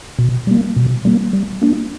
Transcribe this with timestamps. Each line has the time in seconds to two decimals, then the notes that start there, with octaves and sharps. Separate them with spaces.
0.19 B2
0.47 G3 A#3
0.76 B2
1.05 G3 A#3
1.33 G3
1.62 A#3 D4